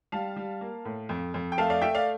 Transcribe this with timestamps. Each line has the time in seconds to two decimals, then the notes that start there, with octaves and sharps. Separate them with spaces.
0.12 G3 F5 A5
0.36 G3
0.61 A#3
0.85 A2
1.09 F2
1.34 F2
1.52 G5
1.58 A3 F5 A5
1.70 D5 F5
1.82 A3 E5 G5
1.94 D5 F5